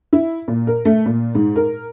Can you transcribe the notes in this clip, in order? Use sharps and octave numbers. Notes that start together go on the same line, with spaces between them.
E4
A#2
A#4
A3
A#2
G#2
A#4